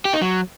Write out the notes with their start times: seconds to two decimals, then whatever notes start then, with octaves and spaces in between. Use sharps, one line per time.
0.05 G4
0.13 D#4
0.22 F#3